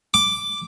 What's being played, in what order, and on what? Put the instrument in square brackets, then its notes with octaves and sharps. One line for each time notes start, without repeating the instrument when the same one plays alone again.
[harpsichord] D6